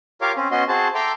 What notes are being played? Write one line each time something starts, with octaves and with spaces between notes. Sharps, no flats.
F4 G4 A#4 C#5 F5 D6
C4 C#4
B3 C#4 F#4 D#5 C6
C4 F#4 G#4 C5 A5
A4 E5 G5 A#5 C6 D6